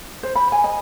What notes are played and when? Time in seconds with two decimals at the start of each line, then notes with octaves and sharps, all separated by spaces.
0.23 C5
0.35 B5
0.52 G#5
0.64 D#5